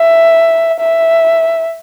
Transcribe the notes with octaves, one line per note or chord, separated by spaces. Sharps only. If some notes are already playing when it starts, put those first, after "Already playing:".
Already playing: E5
E5